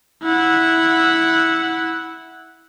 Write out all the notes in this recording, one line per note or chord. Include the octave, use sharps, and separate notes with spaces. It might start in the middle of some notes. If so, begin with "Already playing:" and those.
E4 F#5